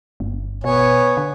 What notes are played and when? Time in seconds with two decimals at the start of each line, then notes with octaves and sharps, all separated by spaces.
0.20 G1
0.64 B2 B3 C#5 G#5
1.17 D3